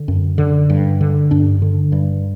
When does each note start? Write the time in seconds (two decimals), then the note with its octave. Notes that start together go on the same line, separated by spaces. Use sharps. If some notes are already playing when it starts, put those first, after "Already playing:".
Already playing: D3
0.08 F#2
0.38 D3
0.70 G2
1.01 D3
1.31 G2 D4
1.62 D3
1.92 G2